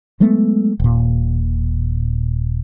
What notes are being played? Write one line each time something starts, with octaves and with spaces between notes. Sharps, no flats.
F#3 G#3 A3 B3
D#1 A#2